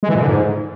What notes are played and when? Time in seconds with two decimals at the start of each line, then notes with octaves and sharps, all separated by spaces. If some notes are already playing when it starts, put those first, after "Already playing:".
0.03 G#3
0.09 E3
0.15 A#2
0.21 D3
0.28 G#2